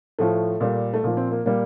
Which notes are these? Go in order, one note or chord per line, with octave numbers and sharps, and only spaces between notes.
A2 F3 A3
A#2 G3
A3
A#2 F3 A#3
C4
A#3
A#2 G3 A#3